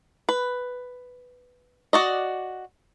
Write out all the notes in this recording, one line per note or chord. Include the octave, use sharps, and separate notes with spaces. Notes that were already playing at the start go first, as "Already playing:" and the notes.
B4
F#4 D5 D#5